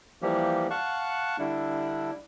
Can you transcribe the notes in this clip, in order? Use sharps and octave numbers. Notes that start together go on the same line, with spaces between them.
E3 F3 G3 A#3 G4
F5 F#5 A5 C#6 F#6
D3 G3 D4 E4